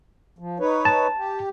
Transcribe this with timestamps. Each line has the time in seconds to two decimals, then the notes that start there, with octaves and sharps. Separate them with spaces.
0.39 F3
0.60 D#4 B4 C#5
0.85 A5
1.17 G4